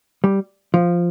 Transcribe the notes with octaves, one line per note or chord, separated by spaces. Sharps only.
G3
F3